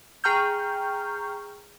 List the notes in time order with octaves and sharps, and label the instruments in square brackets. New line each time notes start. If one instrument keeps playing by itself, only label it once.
[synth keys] G#4 G5 A#5 C#6 F6 G6